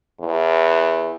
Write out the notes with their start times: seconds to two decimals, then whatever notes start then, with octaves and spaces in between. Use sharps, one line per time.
0.20 E2